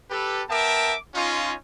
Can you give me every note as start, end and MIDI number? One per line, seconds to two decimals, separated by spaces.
0.11 0.42 67
0.11 0.42 69
0.11 0.42 71
0.50 0.95 59
0.50 0.95 70
0.50 0.95 76
0.50 0.95 79
0.50 0.95 81
0.50 0.95 86
1.15 1.53 61
1.15 1.53 63
1.15 1.53 65